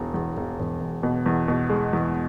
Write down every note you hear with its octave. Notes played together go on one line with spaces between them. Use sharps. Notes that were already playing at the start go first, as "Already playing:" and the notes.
Already playing: E1 E2
E2
E1
E1
E1
B2
E2
B2
G#3
E2